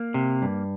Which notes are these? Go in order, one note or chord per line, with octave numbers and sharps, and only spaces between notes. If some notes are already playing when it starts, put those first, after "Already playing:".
Already playing: A#3
C3
G2